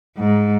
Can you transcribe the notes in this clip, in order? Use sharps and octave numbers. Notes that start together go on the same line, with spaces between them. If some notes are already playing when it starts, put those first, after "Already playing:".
G#2